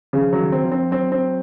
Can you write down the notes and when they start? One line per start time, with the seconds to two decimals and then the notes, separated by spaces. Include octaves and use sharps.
0.13 C#3 F3
0.33 F#3
0.39 D#3
0.52 C4
0.65 F3
0.72 C4
0.91 F#3 C4
1.12 C4